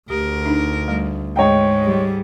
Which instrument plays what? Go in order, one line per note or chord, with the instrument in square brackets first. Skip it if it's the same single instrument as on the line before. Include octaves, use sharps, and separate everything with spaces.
[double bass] D2 [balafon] A3 G4 [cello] A#4
[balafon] D4 D#4
G3 A3
[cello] G#2 G#3 [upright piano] C#5 D#5 G5
[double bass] G3